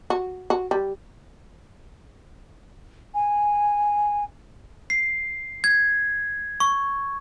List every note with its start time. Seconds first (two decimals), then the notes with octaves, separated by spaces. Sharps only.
0.10 F#4
0.50 F#4
0.71 G3
3.14 G#5
4.90 C7
5.64 G#6
6.60 C#6